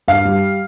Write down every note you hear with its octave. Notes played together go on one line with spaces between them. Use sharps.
G2 F5
G3